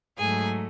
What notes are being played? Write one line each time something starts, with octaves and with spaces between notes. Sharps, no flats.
G#2 F#3 A3 G#4 G#5